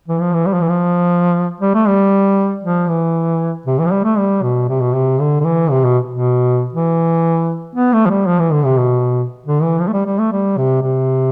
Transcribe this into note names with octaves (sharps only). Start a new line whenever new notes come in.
E3
F3
E3
G3
F3
E3
F3
G3
A3
G3
F3
E3
C3
E3
F3
G3
A3
G3
B2
C3
B2
C3
D3
D3
E3
C3
B2
B2
E3
B3
A3
F3
G3
F3
E3
D3
C3
B2
D3
E3
F3
A3
G3
G3
A3
G3
C3
C3